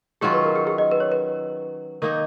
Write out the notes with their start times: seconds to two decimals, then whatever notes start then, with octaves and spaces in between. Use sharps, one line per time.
0.21 D#3 F#3 C#4 F4 G#4
0.33 B4
0.44 A#4
0.56 G#4
0.67 G#4
0.78 D#5
0.91 B4
1.00 C#5
1.12 B4
2.02 D#3 A#3 D#4 A#4